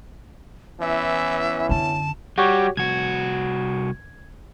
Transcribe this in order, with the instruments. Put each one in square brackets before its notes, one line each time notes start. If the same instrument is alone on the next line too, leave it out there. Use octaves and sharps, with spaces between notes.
[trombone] E3 [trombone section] B3 C#4 E4 [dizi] E5
[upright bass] F#2 D3 [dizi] A5
[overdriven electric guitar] G3 [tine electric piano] F#4 G4 C#5
[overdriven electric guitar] C2 F#4 [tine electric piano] G#6